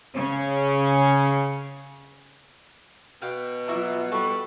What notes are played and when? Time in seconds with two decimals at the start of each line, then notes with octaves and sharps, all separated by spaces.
0.15 C#3 C#4
3.22 B2 F5 G5
3.68 F#3 A#3 F4 F#4 E5
4.12 G3 F#4 A4 B4 C#6